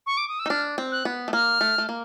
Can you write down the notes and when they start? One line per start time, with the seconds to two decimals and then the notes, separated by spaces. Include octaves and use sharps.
0.06 C#6
0.17 D6
0.28 D#6
0.39 E6
0.46 D#4
0.49 D4 F6
0.78 C4
0.92 F#6
1.05 B3
1.28 A3
1.33 A#3 F6
1.61 A3
1.78 A3
1.89 A#3